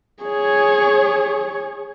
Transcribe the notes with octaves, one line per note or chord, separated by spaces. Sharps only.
G#4 C#5